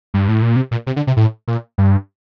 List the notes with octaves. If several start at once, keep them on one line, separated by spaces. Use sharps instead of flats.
G2
A2
A#2
C3
A#2
C3
D3
C3
A2
A#2
G2